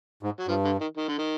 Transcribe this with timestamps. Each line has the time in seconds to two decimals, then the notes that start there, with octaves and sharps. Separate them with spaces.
0.23 G#2
0.39 F#3
0.48 G2 F3
0.65 D3
0.81 D#3
0.97 D#3
1.08 D3
1.19 D#3